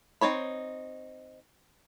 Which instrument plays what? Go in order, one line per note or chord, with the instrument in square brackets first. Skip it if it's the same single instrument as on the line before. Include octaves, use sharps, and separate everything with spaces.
[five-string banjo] C4 D#4 C#5 B5